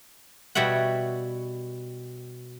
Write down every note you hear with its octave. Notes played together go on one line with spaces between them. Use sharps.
B2 G3 C#5 E5 F#5